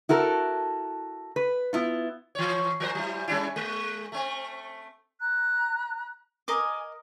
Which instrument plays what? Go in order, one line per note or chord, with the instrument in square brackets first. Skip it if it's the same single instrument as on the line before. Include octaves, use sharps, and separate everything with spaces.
[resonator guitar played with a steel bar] E4 F#4 A4 A#4
B4
B3 E4 F4
[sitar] E3 C#5
F3 A#4 C5
F#3 E4
G3 C#4 E4
G#3
A3 C4
[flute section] A#5 F#6
[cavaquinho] A#4 D#5 D6 [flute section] G#5